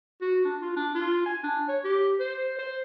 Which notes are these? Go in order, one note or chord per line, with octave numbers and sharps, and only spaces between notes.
F#4
D4
F4
D4
F4
G#5
D4
C#5
G4
C5
C5